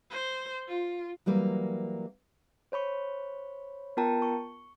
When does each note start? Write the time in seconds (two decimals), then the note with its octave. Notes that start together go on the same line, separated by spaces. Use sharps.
0.11 C5
0.68 F4
1.26 E3 F#3 G3 A#3
2.72 C5 C#5 B5 C#6
3.97 B3 F4 A#4 G5 A5 A#5
4.22 C#6